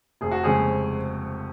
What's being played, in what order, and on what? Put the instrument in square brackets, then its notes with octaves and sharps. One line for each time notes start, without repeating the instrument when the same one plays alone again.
[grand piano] F1 [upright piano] G#4
[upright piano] F#4
[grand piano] F2 C#3 G#3 C#4 [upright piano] G#4